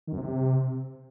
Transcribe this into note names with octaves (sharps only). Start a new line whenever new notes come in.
D#3
F#2
C3